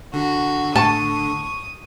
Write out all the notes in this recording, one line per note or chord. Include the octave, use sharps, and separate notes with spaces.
D3 F#4
A2 A5 C#6 D#6